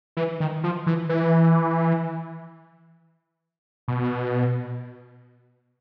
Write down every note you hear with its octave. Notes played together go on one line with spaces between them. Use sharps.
E3
D#3
F3
E3
E3
B2